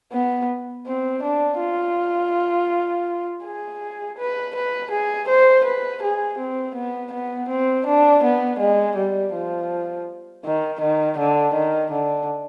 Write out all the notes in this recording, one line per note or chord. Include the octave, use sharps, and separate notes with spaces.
B3
C4
D4
F4
G#4
B4
B4
G#4
C5
B4
G#4
C4
B3
B3
C4
D4
B3
G#3
G3
F3
D#3
D#3
D3
D#3
D3